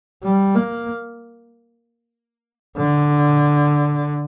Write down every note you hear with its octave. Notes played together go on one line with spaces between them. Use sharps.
G3
A#3
D3